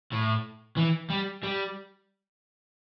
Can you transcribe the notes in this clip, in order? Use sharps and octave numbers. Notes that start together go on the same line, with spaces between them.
A2
E3
G3
G3